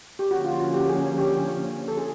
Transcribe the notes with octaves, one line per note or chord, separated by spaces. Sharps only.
G4
D3 F3 A#3 C#4 F#4
F4
F#4
G4
G#4
G4
A4
G#4